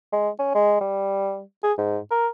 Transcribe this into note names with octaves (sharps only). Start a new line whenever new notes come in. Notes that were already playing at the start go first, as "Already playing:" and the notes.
G#3
C#4
G#3
G3
G#4
G#2
A#4